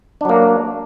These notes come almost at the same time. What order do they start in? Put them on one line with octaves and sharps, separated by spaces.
D4 F#3 A#3